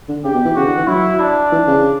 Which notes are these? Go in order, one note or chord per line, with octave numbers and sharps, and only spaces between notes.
D3
C#3 G4
B2
E3
C#3 F#4
D3
E3
F#3 E4
D4
E3
C#3